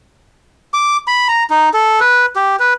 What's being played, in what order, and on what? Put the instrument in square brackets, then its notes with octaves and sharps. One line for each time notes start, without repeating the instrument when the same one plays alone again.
[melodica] D6
B5
A#5
D#4
A4
B4
G4
B4